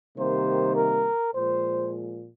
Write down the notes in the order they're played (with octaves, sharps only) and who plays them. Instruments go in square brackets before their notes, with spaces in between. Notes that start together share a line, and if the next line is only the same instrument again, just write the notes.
[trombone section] C3 D#3 G3 A#3 C5
A#4
A#2 F3 G#3 C5